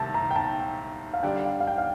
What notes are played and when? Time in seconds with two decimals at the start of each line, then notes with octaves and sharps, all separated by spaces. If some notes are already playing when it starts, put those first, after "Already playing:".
Already playing: C2 C3 D#3 A3 A5
0.14 A#5
0.31 G5
0.36 A5
1.14 F5
1.23 D3 G3 D4 G5
1.45 F5
1.60 F5
1.67 G5
1.78 F5